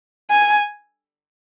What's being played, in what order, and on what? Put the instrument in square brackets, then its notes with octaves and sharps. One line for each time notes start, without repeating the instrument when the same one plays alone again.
[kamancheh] G#5